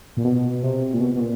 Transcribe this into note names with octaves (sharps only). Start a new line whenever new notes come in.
A#2
B2
C3
A#2
B2
B2
A#2